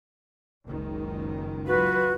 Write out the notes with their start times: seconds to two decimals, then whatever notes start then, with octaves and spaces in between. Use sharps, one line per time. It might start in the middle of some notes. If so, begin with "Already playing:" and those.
0.66 F#1 C#2 D#3
1.67 F#3 F4 F#4 B4